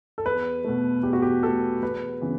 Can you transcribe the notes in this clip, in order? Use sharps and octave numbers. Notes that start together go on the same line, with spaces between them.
A4
E2 B4
B2 A3
E2 G4
F#4
G4
B2 A3 A4
E2 B4
C#3 E3 B3